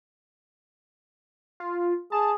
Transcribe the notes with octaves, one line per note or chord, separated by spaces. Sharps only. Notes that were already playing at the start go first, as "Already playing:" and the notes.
F4
G#4 A5